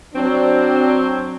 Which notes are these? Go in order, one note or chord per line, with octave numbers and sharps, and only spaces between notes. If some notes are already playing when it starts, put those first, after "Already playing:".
F#3 C4 D4